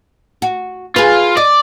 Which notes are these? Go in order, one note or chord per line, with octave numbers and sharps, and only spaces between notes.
F#4
F4 G#4 B4
D5 D#5